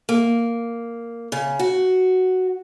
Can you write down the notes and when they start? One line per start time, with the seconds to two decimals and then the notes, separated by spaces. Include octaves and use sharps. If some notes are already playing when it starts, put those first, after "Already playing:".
0.09 A#3
1.32 C#3
1.59 F#4